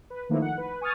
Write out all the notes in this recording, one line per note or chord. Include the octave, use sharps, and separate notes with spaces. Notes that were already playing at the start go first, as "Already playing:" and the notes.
B4
D#3 F3 A3 A#3 D#4 E4
F#5
B4
G#5 C#6 D#6 F6 A6